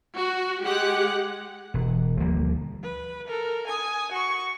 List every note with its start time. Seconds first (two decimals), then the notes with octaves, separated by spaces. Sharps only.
0.15 F#4
0.62 G#3 G4 F#5
1.74 E1
2.20 D2 F3 G3 A#3
2.82 B4
3.27 A4 A#4
3.67 G#5 D#6
4.11 F#4 C#6